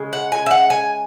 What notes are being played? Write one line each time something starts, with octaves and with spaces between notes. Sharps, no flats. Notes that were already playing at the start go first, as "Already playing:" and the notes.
Already playing: C#3 G#3
F#5
G#5
E5
F#5
G#5